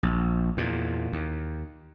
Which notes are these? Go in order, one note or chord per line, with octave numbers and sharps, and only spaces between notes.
A#1
E2 A#2
D#2